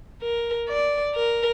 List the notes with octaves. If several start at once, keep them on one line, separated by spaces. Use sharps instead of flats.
A#4
D5
A#4